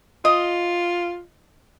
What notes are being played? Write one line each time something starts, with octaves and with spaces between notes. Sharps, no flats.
F4 D#5